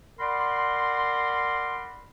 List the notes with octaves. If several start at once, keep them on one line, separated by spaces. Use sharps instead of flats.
A#4 D5 F#5 B5 C6